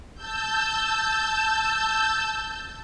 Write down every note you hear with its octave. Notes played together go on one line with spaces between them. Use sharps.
A5 E6 G6